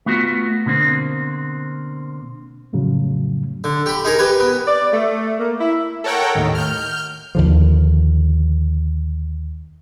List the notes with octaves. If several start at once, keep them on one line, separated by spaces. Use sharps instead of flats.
A3 B3 F4 F#4
B2 D3 A#3 C4
F2 A2 C#3 F#3
D3
G4 B5
D#4 G#4 A#4
G4 B4 G#5
B3
D5
A3
A#3
E4
A4 A#4 C#5 F#5 G5 A#5
D#2 A2 D#3
F6 G6
D#2 D3 F3